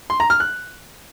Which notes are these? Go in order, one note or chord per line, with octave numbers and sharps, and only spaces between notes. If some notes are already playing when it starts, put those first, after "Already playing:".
C6
A#5
F6
F#6